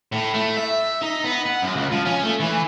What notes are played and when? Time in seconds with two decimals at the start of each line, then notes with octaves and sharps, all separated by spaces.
0.12 A2
0.34 A3
0.57 E5
1.02 D#4
1.24 B3
1.46 F#5
1.62 F#2
1.76 C#2
1.92 F3
2.05 C#4
2.23 A3
2.40 E3